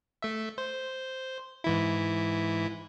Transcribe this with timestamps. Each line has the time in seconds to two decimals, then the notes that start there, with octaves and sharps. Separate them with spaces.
0.22 A3 E5
0.58 C5
1.64 G#2 E3 E4